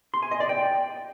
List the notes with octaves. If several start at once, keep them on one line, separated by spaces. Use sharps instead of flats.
C6
G#5
D#5
D5
G5